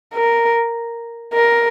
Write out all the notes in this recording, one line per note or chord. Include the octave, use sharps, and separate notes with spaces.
A#4
A#4